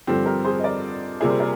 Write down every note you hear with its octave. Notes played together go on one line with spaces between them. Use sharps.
G2 D3 F3 C4 G4
G4 A#4
G#4 C5
D#5
A#4 D5
C3 G3 A#3 F4 G#4 D5
C5
A#4 D5